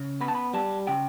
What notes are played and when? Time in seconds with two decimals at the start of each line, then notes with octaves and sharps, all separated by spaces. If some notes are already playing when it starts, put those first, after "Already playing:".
Already playing: C#3
0.21 B3 B5
0.28 A5
0.35 B5
0.53 G3 A5
0.87 C#3 G5